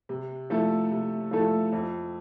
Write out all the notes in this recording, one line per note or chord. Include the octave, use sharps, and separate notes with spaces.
C3
F3 A3 E4 A4
C3
F3 A3 E4 A4
F2